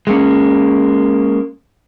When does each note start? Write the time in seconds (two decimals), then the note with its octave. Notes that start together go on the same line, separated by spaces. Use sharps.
0.07 G#3 A#3 C#4